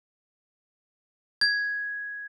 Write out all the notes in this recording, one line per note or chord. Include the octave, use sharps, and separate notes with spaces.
G#6